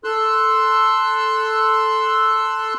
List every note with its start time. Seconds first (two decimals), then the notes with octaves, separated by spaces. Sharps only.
0.04 A4 C6 E6 F#6